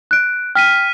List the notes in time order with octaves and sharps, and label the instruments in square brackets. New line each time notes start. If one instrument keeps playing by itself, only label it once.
[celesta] F#6 D7
[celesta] G5 [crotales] F6 B6 D#7